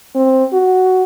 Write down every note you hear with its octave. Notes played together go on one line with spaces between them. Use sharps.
C4
F#4